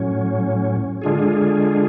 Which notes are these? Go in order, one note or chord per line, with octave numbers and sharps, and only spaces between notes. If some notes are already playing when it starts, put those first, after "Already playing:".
Already playing: A2 F#3 C#4
D3 G#3 D4 F4 G#4